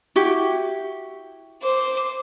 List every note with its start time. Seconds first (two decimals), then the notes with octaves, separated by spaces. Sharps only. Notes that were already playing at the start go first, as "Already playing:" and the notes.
0.16 E4 F#4 G4
1.62 C5 D6